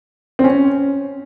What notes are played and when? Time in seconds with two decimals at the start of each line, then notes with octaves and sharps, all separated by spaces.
0.39 C4
0.44 C#4